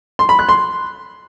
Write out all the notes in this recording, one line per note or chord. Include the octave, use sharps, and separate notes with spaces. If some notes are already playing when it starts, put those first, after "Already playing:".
C6
B5
F#6
C6